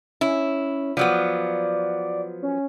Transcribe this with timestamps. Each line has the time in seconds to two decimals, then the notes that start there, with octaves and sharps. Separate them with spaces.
0.21 C#4 E4
0.97 F3 F#3 B3 D5
2.43 C#4